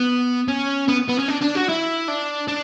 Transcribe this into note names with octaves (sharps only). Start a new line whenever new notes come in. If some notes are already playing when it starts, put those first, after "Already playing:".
Already playing: B3
C#4
B3
B3
C#4
D4
D4
F#4
E4
D4
D4